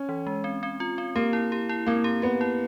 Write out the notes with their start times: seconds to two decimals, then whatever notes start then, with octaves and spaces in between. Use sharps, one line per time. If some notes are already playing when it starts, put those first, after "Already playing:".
Already playing: C#4
0.09 E3
0.27 G#3
0.44 C4
0.63 C4
0.80 F4
0.98 C4
1.15 A#3 G4
1.33 E4
1.52 G4
1.69 E4
1.86 A#3 C4
2.04 G4
2.22 B3 G4
2.41 E4